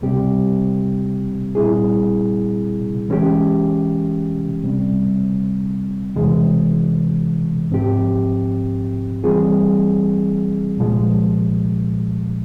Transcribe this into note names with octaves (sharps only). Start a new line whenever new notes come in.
C#2 C3 G3 C4 G4
A#2 G3 C4 E4 G#4
E3 G#3 C#4 G4
C#2 C3 G3 C4
E2 C3 E3 G#3
G#2 F3 C4 G4
E3 G3 C4 F4 G#4
C2 A#2 F3 G#3